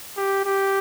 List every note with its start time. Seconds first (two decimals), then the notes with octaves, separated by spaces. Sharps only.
0.17 G4
0.45 G4